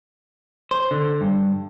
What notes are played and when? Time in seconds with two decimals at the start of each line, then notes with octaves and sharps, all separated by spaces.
0.71 C5
0.91 D3
1.21 G2